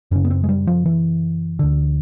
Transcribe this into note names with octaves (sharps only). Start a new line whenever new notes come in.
F#2 C#3 C#4
B3
C4
G#3
G3
F3
E3
D2 D3